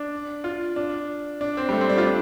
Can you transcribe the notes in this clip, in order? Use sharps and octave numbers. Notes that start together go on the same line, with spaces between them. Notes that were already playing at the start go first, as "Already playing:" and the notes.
Already playing: D4
F4
D4
D4
C4
G3
A3
C4
D4
F4
D4